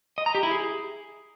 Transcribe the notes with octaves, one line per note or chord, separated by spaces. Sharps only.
D#5
A#5
G4
E4
G#4